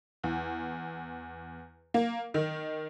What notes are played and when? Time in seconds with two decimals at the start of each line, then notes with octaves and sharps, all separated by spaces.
0.23 E2
1.94 A#3
2.34 D#3